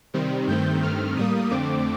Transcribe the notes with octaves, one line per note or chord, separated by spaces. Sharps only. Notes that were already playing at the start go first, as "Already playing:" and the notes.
C3 D#3 G3 C4
G2 D#3 A3 C4 G6
G2 D#3 A3 C4 F6
A2 G3 A#3 D#6
F2 D3 A3 C4 D6